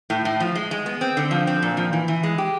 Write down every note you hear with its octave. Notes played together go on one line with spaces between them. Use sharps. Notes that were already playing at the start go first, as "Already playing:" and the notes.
A2
A2
F3
G#3
G#3
B3
C4
D3
F3
C4
A#2
F3
E3
E3
G#3
G4